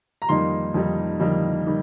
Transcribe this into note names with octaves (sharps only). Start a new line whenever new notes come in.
A#5
F2 D#3 G3 A#3 D#4 C6
F2 D#3 G3 A#3 D#4
F2 D#3 G3 A#3 D#4
D#3 G3